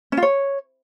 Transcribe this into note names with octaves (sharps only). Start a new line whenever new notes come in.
C#4
F4
C#5